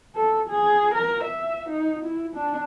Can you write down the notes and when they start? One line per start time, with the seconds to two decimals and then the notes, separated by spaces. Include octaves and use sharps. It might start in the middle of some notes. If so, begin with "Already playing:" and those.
0.15 A4
0.49 G#4
0.94 A#4
1.23 E5
1.69 D#4
2.05 E4
2.35 D4